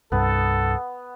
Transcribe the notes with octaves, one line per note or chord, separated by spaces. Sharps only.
C2 G2 B3 A4